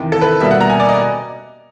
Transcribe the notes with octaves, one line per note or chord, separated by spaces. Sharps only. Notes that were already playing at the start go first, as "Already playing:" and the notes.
Already playing: E2 C3 D#3
A4
B4
B2 G3 A#3 E5
F#5
A#5
G#5
D5
D#5